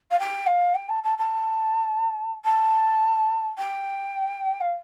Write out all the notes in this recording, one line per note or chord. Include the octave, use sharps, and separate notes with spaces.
F5
G5
F5
G5
A5
A5
A5
A5
G5
F5